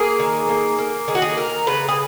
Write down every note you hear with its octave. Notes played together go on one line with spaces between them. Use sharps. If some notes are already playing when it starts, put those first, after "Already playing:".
Already playing: A#3 G#4
D#3
A#3
A#3
D#3 G#4
F#4
G#4
D#3 A#4
C#3 B4
G#4